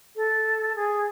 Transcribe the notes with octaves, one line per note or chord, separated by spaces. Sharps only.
A4
G#4